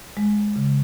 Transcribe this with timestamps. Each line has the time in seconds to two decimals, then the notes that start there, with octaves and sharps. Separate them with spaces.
0.17 G#3
0.56 C#3